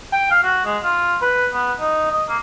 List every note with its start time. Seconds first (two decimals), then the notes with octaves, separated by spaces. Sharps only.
0.13 G5
0.31 F5
0.44 F#4
0.65 G#3
0.83 F4
1.22 B4
1.53 B3
1.80 D#4
2.11 D#5
2.29 A#3